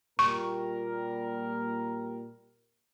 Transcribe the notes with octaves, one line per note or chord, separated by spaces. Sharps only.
A#2 G3 A#4 C#6